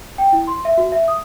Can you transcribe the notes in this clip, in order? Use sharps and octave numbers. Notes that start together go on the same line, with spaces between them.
G5
E4
C6
E5
F#4
E5
D#6